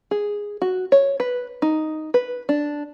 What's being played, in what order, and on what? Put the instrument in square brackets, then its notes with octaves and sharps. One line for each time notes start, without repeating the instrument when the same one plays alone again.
[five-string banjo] G#4
F#4
C#5
B4
D#4
B4
D4